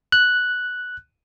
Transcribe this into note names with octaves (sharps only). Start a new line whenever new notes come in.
F#6